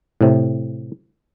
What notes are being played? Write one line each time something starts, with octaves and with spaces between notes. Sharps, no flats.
A2 C3